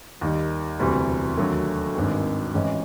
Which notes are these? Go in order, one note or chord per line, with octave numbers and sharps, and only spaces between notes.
D#2 D#3 G3
E1 D2 C3 E3 G3
D#2 D3 F#3 A3
G#1 G2 D#3 G#3 C4
A1 G#2 E3 G#3 C#4